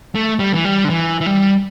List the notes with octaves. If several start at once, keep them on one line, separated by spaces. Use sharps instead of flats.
A3
G3
E3
G3
D3
E3
E3
G3